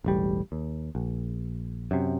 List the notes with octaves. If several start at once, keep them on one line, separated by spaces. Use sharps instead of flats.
E1 A1 G3
D#2
A#1
F#2 C3